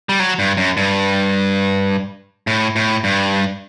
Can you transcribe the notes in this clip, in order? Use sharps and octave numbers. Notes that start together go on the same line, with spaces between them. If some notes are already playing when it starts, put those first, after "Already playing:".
G3
F#3
G2
F#2
G2
A2
A2
G2